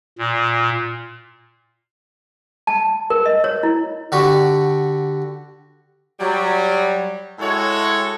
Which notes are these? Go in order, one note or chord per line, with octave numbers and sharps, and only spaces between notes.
A#2
A5
A#4
D#5
C#5
E4
D3 F#4 G4
F#3 G3
A2 G#3 E4 F#4 A4 C#5